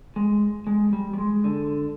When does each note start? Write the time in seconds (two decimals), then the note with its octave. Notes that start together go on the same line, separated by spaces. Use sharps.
0.16 G#3
0.67 G#3
0.93 G3
1.13 G3
1.18 G#3
1.44 D3